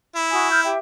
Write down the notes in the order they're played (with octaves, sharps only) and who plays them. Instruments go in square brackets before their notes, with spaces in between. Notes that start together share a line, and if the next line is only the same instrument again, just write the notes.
[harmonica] E4
[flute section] F#4 G#5 D#6
F6 G6
G4 E5 G5